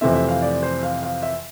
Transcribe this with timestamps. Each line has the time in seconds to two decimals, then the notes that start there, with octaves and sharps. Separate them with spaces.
0.01 F2 C3 E3 A3 C4 E5
0.15 E5
0.29 F5
0.42 D5
0.63 C5
0.83 F5
1.03 F5
1.22 E5